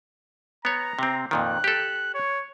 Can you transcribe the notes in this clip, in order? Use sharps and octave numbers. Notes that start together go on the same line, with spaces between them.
B3 C#5 A#5
C3 C4
F2 A#2 D#3 F#6
G4 A4
C#5